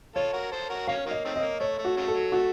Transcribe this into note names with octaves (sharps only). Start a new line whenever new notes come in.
F4 A4 C#5
F#4 A#4
A4 C5
F#4 A#4
F#3 A#3 C#4 F5
D#3 F#3 A#3
D#5
D#3 A3 C4
D#5
A#3
A3 C#5
A3
F#4
C#3 F#3 A3
A4
F#3
A3 F#4